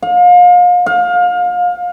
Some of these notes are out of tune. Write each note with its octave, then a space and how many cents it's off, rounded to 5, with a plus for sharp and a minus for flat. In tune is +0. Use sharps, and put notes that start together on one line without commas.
F5 +35
F5 +25